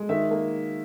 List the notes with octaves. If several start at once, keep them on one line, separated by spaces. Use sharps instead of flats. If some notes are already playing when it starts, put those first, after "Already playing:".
Already playing: G#3
D#3 E5
A#3